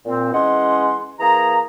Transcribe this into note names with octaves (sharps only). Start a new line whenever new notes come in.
A#2 C4
E3 G#3 C#4 D#5 F#5 C6
E3 A#3 G#4 A#5